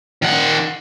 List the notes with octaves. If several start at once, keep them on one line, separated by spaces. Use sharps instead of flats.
D#3 F#5